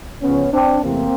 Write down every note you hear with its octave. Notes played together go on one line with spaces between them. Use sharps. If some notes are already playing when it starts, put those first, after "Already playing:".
C#2 C#3 F3 B3 C#4
C4 D4
E2 C3 E3 A3 A#3 C4